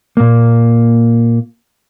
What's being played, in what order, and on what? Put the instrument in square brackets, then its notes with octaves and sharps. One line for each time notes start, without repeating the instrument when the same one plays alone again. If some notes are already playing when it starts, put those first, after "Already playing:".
[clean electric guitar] A#2 A#3